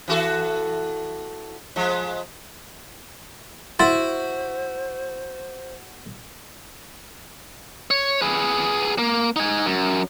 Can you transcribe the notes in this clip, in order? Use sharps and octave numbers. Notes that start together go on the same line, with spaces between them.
E3 F#4 A4
F3 G#3
E4 F#4 C5 C6 A6
C#5
G#4 B4
A#3
D#4 G#5
F#2